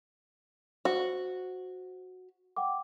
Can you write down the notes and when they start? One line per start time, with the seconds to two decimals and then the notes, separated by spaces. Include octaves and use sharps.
0.85 F#4 C5
2.56 F#5 G5 D6